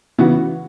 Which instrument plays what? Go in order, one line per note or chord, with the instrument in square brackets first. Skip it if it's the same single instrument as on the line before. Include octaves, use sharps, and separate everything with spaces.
[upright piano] C#3 E3 B3 F#4